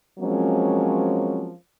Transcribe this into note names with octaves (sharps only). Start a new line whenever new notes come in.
F3 F#3 G#3 A#3 C4 C#4